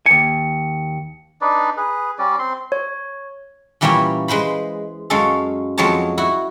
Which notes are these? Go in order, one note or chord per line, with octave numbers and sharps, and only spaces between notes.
D#2 G#5 C#7
D4 D#4 B4 D5
G#4 B4
G3 C#4 D5
C4 C6
C#5
A#2 E3 G3 A#3 C#4 E4
G#3 B4 C5 B5
F#2 G#3 C#4 A4 F5
F2 F#3 G#3 C#5 A5
E4 F#4